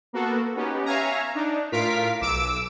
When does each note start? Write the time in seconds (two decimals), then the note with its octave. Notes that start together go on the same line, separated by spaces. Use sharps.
0.13 A#3 B3 F#4 A4
0.55 B3 C#4 D#4 G4
0.85 C#5 E5 F5 G#5 A#5
1.35 D4 D#4
1.72 A2 F4 A#4 F5 B6 D7
2.21 B1 D6 E6 D7